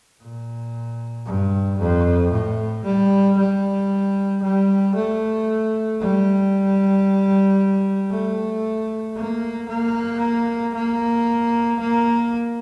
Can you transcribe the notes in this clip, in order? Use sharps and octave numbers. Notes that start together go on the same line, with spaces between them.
A#2
G2
F2
A2
G3
G3
G3
A3
G3
A3
A#3
A#3
A#3
A#3